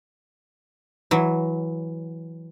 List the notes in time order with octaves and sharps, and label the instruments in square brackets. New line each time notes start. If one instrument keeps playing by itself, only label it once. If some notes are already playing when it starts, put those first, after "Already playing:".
[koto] E3 F#3